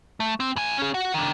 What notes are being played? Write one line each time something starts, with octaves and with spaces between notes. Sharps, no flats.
A3
C4
A2 G#5
C#4 G#4
F#4
D#3 D4